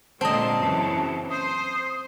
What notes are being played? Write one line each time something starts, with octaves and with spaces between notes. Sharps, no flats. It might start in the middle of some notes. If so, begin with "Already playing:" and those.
A#2 D3 G#3 C4 D#5 A5
F#2 C#3 E3
C5 D#6